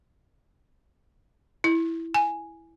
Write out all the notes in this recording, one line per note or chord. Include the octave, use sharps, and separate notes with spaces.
E4
G#5